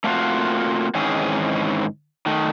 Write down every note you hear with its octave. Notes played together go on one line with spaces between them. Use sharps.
A3 A#3 C4 F4 F#4
G#2 D#3 E3 C4 C#4 G#4
D#3 A3